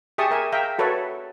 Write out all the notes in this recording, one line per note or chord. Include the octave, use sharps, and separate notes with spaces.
G4 G#4 E5 A5 C#6 D#6
A#4 E5 G#5
E5 F5 G5 A#5
F#4 A4 B4 C#5 E5